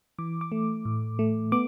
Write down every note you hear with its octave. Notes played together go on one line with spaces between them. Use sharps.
E3 D6
D6
A3
A2
A3
B3 D6